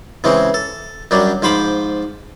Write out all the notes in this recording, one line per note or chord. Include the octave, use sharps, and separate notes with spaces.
C#3 E3 G#3 C4
A4
F#2 F#3 G3 D4
G#2 F3 C5 B5 D6